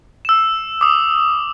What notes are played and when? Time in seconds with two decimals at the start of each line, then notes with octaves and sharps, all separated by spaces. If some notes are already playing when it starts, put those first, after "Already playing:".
0.25 E6 E7
0.81 D6 D#6